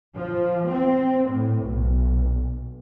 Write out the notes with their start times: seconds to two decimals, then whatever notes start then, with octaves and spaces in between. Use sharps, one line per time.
0.15 F3
0.68 C4
1.30 A2
1.65 B1